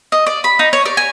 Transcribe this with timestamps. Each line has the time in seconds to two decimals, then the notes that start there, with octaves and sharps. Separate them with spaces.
0.12 D#5
0.27 D5
0.44 B5
0.59 D#4
0.73 C#5
0.86 D5
0.97 G#5